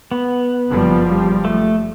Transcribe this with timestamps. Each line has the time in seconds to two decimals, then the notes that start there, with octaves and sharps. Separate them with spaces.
0.11 B3
0.69 F#1 F3 G3
1.45 A3